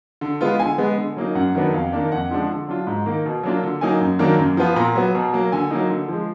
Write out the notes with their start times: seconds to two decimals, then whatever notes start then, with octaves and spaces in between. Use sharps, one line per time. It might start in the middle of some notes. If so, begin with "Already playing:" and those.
0.21 D3
0.41 G#3 B3 F4
0.59 D3 G#5
0.78 G#3 B3
0.97 D3
1.16 F#3 A#3 D#4
1.35 F#2 F#5
1.55 D#3 F#3 B3 D4
1.73 F2 F5
1.92 D#3 A#3 D4
2.11 F2 F#5
2.30 D3 F3 G#3 D4
2.49 D3
2.68 F#3 D4 F4
2.87 G#2
3.06 D#3 A#3
3.25 B2
3.43 F#3 A#3 D4 F4
3.63 D3
3.81 F#3 A#3 D#4 G#5
4.01 F#2
4.19 D#3 F#3 A#3 D4
4.39 F#2
4.57 F3 B3 F4
4.76 A#2 A#5
4.95 F#3 B3
5.15 B2
5.33 F#3 A#3
5.52 D3 G#5
5.70 F#3 A#3 D#4
5.89 D3
6.08 F3 G#3